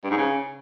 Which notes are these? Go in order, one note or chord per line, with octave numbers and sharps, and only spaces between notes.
G2
G#2
C#3